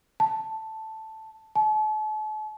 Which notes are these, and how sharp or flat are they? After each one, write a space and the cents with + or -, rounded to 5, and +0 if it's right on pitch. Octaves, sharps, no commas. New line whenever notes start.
A5 +0
A5 -40